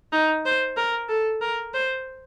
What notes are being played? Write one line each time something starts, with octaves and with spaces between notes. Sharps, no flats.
D#4
C5
A#4
A4
A#4
C5